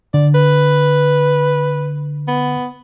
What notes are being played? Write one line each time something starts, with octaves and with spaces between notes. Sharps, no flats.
D3 D5
B4
B3